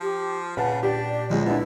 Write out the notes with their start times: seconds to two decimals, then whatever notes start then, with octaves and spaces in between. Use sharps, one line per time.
0.01 F3 G4
0.57 A#2 C#3 B4 F#5 A5
0.83 D4 G4 D5
1.13 D5
1.30 C#2 F3 G#3 D#5
1.45 F#2 B3 D4 E4